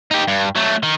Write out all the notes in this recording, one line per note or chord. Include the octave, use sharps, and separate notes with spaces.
D#4 G4
G2
F#3 A3
D#3